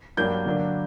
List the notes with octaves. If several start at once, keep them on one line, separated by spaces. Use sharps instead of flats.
G2 F#3 A#3 D4 G6
D3 F#3 A#3 D4